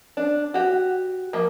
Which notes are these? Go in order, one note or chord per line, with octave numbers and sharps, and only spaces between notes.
D4
F#4 G4
F3 A#3